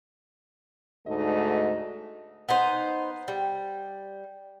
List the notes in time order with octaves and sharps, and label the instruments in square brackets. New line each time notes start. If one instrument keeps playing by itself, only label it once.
[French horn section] D2 G#2 A3 D#4 D#5
[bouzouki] B3 D#4 C5
G3